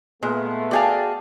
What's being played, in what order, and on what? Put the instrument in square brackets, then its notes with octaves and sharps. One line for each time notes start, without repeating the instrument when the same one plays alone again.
[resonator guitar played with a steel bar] A#2 [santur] G#3 [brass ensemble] A3 B3
[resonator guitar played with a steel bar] F#4 G#4 F5 [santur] D5 G5 A5